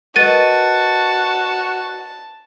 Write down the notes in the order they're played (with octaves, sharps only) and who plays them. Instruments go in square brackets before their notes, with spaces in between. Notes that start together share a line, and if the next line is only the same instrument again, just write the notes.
[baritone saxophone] F#4 [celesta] A#4 B4 D#5 [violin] A5 [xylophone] A6 D#7